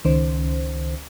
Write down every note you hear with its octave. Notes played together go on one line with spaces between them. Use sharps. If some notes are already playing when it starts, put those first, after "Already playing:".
C#2 D#3 C#4 C5